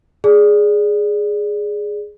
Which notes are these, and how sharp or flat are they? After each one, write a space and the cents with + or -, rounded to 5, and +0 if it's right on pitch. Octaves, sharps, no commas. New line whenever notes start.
G#4 +0 D5 -5